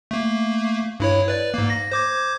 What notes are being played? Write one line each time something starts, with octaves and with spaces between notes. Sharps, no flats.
A3 A#3
G2 E4 C#5
B4 D5
G#2 A#3
A#6
C5 D6 G#6